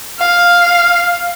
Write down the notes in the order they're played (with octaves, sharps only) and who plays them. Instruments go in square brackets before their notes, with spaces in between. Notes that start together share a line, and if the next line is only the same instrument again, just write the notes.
[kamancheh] F5